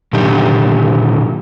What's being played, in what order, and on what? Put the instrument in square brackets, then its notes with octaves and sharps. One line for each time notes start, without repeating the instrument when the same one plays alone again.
[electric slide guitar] A#2 D3 D#3 F#3 G4